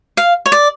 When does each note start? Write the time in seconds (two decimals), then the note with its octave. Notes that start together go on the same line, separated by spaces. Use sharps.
0.17 F5
0.46 C#5
0.52 D5